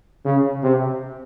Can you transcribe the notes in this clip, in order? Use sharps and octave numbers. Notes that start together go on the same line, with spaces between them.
C#3
C3